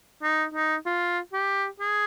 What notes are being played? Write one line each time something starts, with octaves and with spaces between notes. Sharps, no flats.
D#4
D#4
F4
G4
G#4